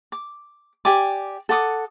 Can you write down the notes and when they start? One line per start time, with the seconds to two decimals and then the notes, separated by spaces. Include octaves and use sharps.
0.12 D6
0.85 G4 D5 G#5 D6
1.49 A4 F#5 D6 D#6